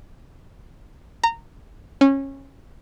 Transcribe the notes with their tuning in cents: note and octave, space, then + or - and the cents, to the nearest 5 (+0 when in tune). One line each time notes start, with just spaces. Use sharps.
A#5 -20
C#4 -20